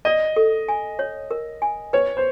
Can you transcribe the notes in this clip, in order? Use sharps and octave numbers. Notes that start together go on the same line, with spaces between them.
D5 D#5
A4
G#5
C#5
A#4
G#5
B4 C#5
C5